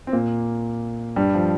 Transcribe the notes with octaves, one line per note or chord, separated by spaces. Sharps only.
C4
A#2 A#3
G2 G3
F3